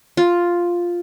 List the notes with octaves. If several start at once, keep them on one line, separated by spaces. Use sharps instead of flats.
F4